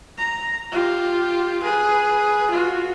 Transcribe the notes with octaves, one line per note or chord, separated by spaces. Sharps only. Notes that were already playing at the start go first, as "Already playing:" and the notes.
A#5
F4 G4
G#4 B4
F4 F#4